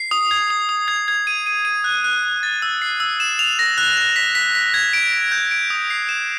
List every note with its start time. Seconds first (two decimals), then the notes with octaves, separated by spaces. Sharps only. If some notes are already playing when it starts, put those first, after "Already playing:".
Already playing: C7
0.11 D#6
0.31 G#6
0.50 D#6
0.69 D#6
0.88 G#6
1.08 G#6
1.27 D#7
1.46 D#7
1.65 D#7
1.84 F#6
2.04 F#6
2.23 F#6
2.43 A6
2.62 E6
2.82 C7
3.00 E6
3.20 E7
3.39 F7
3.59 A#6
3.78 F#6
3.97 F7
4.16 B6
4.35 B6
4.55 B6
4.74 G#6
4.93 D7
5.13 B6
5.32 G6
5.51 D7
5.70 D#6
5.90 C7
6.09 E7